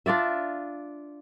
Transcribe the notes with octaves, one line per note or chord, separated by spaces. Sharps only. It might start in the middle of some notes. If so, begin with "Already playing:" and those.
D4 F4 D5 E5